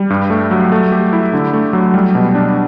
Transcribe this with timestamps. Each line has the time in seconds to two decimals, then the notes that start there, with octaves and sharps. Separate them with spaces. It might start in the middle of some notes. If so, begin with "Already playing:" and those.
Already playing: G3
0.10 G2
0.30 A3
0.51 F#3
0.72 A3
0.92 G4
1.13 E4
1.33 D3
1.54 A3
1.73 F#3
1.94 G3
2.15 B2
2.35 D4